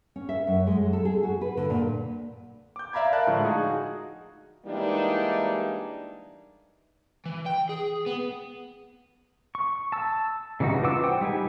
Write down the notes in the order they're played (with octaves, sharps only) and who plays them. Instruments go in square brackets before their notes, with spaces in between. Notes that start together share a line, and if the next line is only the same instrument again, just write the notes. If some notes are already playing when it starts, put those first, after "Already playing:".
[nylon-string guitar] C#4
E5
F#2
G#3
F#3
A4
G#4
F#4
B4
D3
A#2
[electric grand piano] D6 G6
D5 E5 F5 A#5 B5 G#6
A#4 D5 E5 F5 A5 F#6
A2 D3 F3 G#3
D#4 F#4 G#4 F5
[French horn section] E3 G3 G#3 A#3 D4 D#4
[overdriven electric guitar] E3
G5
G#4
B3
[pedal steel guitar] C#6
A5 E6
C#3 E3 G3 D#4 F#4
F4 B4 F#5 D6 E6
C5 F#5 G5
G3 D#4 G4 B4 G#5